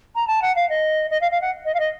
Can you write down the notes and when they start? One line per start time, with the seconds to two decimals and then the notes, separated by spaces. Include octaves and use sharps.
0.15 A#5
0.27 A5
0.41 F#5
0.55 F5
0.69 D#5
1.10 D#5
1.21 F5
1.31 F5
1.41 F#5
1.65 D#5
1.74 F5
1.79 D#5